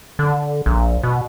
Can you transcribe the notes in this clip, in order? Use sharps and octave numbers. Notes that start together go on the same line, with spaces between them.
D3
A#1
B2